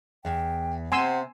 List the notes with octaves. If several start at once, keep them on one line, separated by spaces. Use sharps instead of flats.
E2 G5
C3 C4 F#5 G#5 C6 E6